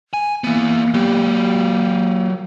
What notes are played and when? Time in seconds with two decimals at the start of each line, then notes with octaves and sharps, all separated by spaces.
0.14 G#5
0.44 E3 A#3 B3
0.94 F#3 G4